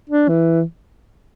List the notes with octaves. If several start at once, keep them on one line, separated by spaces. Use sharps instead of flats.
D4
E3